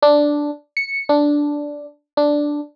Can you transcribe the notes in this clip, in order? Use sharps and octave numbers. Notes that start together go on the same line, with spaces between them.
D4
C#7
D4
D4